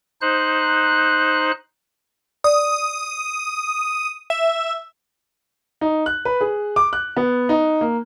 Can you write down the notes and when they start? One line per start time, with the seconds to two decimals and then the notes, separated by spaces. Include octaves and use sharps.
0.21 D#4 C5 F#6
2.44 D5 D#6
4.30 E5
5.81 D#4
6.06 F#6
6.25 B4
6.41 G#4
6.76 D6
6.93 F#6
7.17 B3
7.49 D#4
7.81 A#3